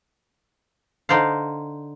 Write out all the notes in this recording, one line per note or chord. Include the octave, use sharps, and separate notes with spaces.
D3 D#4 C5 D5 F5